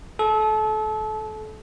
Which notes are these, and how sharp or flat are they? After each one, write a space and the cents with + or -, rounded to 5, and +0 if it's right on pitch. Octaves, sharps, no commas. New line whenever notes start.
A4 -30